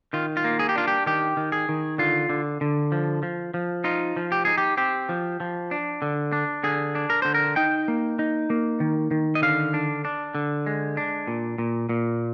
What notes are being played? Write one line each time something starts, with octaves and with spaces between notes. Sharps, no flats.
D#3 F4
F4
A#3
G#4
G4
D4 F4
G4
D#3 G4
D#3
G#4
D#3
D3 F4
D3
D3
F3
F3
F3
D#4 F4
F3
G4
D#4 G#4
G4
C4 G4
F3
F3
D4
D3
D4
D3 G#4
D4
A#4
D3 C5
A#4
D#4 G5
A#3
D#4
A#3
D#3
D#3
D#5
D3 F5
D4
D4
D3
G#3
D4
A#2
A#2
A#2